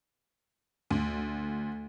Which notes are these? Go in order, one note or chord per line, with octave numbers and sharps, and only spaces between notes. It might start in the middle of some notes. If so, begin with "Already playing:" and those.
D2